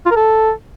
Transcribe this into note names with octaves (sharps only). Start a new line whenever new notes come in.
F4
A#4
A4